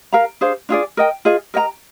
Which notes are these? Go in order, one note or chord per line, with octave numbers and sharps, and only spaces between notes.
A#4 F5 A#5
D4 G#4 C5 F5
D4 F4 G#4 D5
A#4 D#5 G5
F4 G#4 D#5
A#4 D#5 G5 A#5